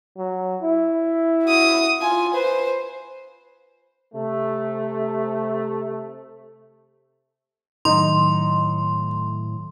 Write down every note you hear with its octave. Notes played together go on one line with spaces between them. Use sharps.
F#3
E4
F#4 D#6
F4 G#5
B4 C5
C3 A3
A2 D#3 F#3 D#4 C6